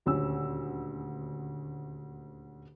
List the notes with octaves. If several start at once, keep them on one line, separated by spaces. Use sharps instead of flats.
D#1 D2 C#4 E6